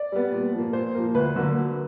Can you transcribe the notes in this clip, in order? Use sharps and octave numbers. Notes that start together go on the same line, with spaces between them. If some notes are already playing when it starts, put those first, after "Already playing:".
Already playing: D5
G3 B3
A#2
F3
A#3
A#2 C5
F3 A#3
D2 B4
D3 F#3 A#3